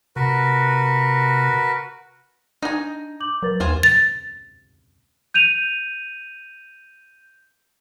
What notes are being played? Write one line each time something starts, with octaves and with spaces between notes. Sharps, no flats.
C3 F#4 A#4 B4
D4 D#4 G#5 G6 A#6
D6 G6 F#7
F#3 A#4 B4 A6
D#2 F4 C5 G#5
A6
G6 D#7 F7